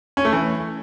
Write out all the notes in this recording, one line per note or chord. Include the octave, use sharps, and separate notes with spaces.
C#4
A3
E3